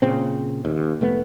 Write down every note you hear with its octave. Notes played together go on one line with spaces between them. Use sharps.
A#2 C#3 C4
D#2
F1 A3 B3